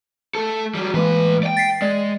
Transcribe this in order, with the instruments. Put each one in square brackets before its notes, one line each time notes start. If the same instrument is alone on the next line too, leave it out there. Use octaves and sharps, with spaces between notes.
[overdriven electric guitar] A3 A4
F#3 G3
[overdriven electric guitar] A2 B4 [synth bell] E3 G#3 A#3
[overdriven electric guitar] D5 G5
[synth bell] A6 B6 C7
[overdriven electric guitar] G#3 [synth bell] D5